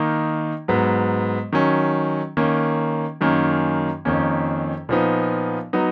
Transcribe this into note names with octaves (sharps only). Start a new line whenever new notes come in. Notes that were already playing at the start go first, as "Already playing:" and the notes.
Already playing: D#3 A#3 D#4
G#2 F#3 B3
D#3 F#3 C#4
D#3 A#3 C#4
F#2 D#3 A#3 C#4
F2 D#3 A#3 C#4
A#2 F3 B3 D#4
F#3 B3 D#4